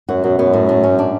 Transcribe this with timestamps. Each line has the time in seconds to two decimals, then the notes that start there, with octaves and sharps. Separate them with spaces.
0.09 F#2 F#4
0.24 F#2 B2
0.38 F#2 B3
0.53 A2
0.69 A2
0.84 C#4
0.99 D4